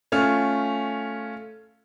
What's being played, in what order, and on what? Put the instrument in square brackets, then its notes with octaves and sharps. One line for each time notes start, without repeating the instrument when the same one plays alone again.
[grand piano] A3 C#4 F4 F6